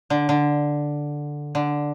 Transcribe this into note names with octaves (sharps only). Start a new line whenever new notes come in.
D3
D3
D3